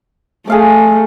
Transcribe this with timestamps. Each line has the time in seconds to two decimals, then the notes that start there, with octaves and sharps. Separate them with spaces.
0.47 A3 G#4 F5 D6